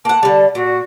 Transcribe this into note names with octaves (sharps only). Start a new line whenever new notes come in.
A#3 F#5 A5
D3 G3
A#2 F#4